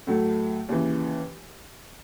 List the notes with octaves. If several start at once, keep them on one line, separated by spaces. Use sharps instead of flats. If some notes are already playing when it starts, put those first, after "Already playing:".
A2 F#3 A3
D#2 C#3 E3